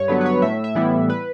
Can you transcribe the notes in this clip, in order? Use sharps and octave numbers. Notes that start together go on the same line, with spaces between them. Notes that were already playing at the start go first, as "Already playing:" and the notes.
Already playing: G2 C#5
D3 F#3 B3 B4
B4
C#5
A2 E5
E5
E3 G3 B3 E4
B4